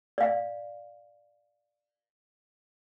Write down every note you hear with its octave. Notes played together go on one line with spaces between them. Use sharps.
D5 F5